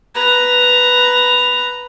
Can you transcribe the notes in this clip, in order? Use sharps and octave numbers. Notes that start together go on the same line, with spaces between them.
B4 A#5